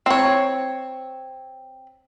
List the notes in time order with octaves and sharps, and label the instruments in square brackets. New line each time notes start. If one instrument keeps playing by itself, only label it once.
[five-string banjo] C4 C#5